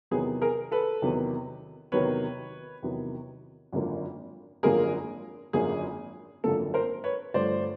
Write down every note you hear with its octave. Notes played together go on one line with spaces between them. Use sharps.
E2 C3 D#3 F#3 B3 G#4
G#4 A#4
A4 B4
E2 C3 D#3 F#3 B3
E2 C3 D#3 F#3 B3 B4 C#5
E2 C3 D#3 F#3 B3
G#1 F#2 D3 F3 A#3
G#1 F#2 D3 F3 A#3 G#4 A#4
G#1 F#2 D3 F3 A#3 G#4
G#1 F#2 D3 F3 A#3 A4
A#4 C5
B4 C#5
G1 G2 D3 F3 A3 C5 D5